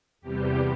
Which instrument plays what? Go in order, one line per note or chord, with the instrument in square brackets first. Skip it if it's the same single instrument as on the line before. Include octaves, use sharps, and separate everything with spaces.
[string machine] E2 C3 E3 G3 G4